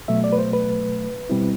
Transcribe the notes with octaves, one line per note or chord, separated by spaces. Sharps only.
B2 F#3 A3 E5
D5
B4
C5
B4
B2 G3 C4 E4